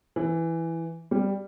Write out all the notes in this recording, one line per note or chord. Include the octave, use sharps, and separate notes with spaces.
E3
G3